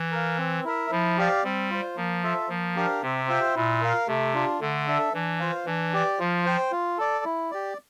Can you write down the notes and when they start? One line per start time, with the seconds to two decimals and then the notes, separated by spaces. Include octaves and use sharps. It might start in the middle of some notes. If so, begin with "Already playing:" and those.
Already playing: E3
0.12 A#4 F5
0.38 C4
0.64 E4 A#4 E5
0.91 F3 E4
1.17 G4 D5 F5
1.44 G3 C4
1.70 F4 C5
1.96 F3 A#3
2.23 F4 A4 E5
2.49 F3 A#3
2.76 D4 G4 A#4 F5
3.02 C3 C4
3.29 F4 C5 E5 G5
3.55 A#2 E4
3.81 A#4 F5
4.08 C3 A3
4.34 D4 F4
4.60 D3 A3
4.87 D4 A4 E5
5.13 E3 D4
5.39 F4 C5 F5
5.66 E3 D4
5.93 G4 D5
6.19 F3 F4
6.45 C5 G5
6.72 F4
6.98 A4 D5
7.25 E4
7.51 G4 D5